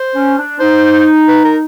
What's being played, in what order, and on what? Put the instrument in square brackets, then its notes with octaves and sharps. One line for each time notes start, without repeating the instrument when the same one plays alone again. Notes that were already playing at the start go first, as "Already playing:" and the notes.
Already playing: [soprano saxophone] C5
[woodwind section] C#4
D4
[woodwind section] D#4 [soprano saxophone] C5
[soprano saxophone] B4
A#4